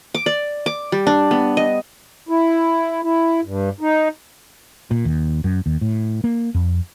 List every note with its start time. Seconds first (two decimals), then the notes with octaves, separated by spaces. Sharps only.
0.15 D6
0.26 D5
0.66 D6
0.92 G3
1.07 D4
1.31 B3
1.57 D#5
2.29 E4
3.03 E4
3.43 G2
3.80 D#4
4.91 A#2
5.05 D#2
5.44 F#2
5.66 D#2
5.81 A2
6.24 A#3
6.54 F2